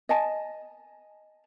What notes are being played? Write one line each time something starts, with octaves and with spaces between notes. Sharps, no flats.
D#5 G#5 A5